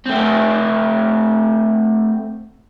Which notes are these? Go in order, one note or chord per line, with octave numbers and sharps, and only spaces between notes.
A3 C4